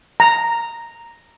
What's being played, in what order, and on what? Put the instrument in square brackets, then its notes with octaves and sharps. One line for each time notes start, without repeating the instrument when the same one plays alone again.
[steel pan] A#5